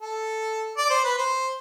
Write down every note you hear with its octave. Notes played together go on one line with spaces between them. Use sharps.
A4
D5
C5
B4
C5